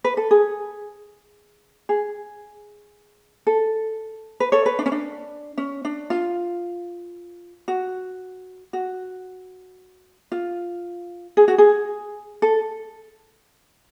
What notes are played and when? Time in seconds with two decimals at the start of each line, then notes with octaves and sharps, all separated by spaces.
0.04 B4
0.17 A4
0.31 G#4
1.89 G#4
3.47 A4
4.40 B4
4.52 A4 C#5
4.66 B4
4.79 D4
4.86 C#4
4.92 D4
5.58 C#4
5.85 D4
6.10 F4
7.68 F#4
8.73 F#4
10.32 F4
11.37 G#4
11.48 F#4
11.58 G#4
12.42 A4